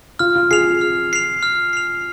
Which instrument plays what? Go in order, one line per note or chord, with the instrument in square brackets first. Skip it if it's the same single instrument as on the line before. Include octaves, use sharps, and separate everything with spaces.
[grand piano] F4 [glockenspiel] F6
[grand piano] F4
[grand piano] G#4 [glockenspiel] C7 F7
[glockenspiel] F6
C7 F7
F6
C7 F7